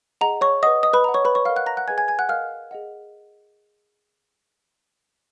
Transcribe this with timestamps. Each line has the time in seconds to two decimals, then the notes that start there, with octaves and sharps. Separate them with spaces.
0.21 G#4 D#5 F#5 A#5
0.41 C#5 C#6
0.63 B4 D#5 F#5 D#6
0.83 D#5 D#6
0.93 B4 B5
1.04 B4 D#5 F#5 A#5
1.14 C#5 C#6
1.25 B4 B5
1.35 C#5 C#6
1.45 A#4 D#5 F5 F#5 F6
1.56 F#5 F#6
1.66 A#5 A#6
1.77 F#5 F#6
1.87 G#4 B4 D#5 F#5 G#5 G#6
1.98 G#5 G#6
2.08 G#5 G#6
2.19 F#5 F#6
2.29 A#4 D#5 F5 F#5 F6
2.71 G#4 D#5 F#5